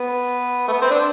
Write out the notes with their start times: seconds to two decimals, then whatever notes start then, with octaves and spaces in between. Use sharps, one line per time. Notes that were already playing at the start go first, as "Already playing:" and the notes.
Already playing: B3
0.68 A3
0.72 B3
0.82 C4
0.91 D4